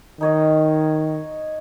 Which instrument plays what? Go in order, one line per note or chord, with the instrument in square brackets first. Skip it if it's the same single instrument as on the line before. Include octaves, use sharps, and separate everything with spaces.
[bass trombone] D#3 [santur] D#4 C#5 D#5